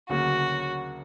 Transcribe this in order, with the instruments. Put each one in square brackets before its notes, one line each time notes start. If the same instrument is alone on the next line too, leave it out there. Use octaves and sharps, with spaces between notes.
[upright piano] D2 C#3 F#3 A#3 [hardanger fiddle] F#4